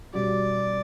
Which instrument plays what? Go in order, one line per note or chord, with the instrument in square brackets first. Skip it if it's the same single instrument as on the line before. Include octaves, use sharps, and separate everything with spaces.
[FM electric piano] B2 G3 C#4 F#4 [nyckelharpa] D5